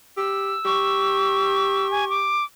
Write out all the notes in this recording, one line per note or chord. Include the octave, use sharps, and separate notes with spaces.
G4 E6
G4 C#6
G#5
D6